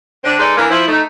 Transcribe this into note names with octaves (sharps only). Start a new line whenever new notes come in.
D3 C4 D4
G#3 D#4 A4 B4 D5
E3 A#3 D4 A#4
F3 E4
A3 D#4